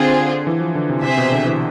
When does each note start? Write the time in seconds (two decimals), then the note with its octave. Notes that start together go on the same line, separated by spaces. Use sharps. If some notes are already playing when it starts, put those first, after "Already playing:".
Already playing: D3 C4 F4 G#4
0.47 E3
0.61 F3
0.75 D3
0.89 C3
1.03 C3 C4 G#4 C5 E5
1.17 B2
1.32 D3
1.46 E3